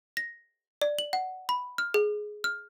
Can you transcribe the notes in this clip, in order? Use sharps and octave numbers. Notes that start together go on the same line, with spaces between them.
A#6
D5
F#7
F#5
B5
F6
G#4
F6